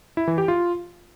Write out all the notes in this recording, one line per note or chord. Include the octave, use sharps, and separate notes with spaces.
E4
E3
G4
F4